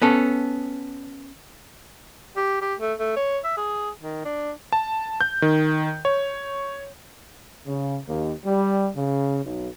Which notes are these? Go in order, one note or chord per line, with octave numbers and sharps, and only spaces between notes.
B3 C#4 A4
G4
G4
A3
A3
C#5
E5
G#4
D#3
D4
A5
G6
D#3
C#5
C#3
D#2
G3
C#3
B1